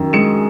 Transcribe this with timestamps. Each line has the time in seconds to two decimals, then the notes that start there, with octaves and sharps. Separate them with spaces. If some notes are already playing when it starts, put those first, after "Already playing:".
Already playing: F#2 D#3
0.13 G#3 C#7 E7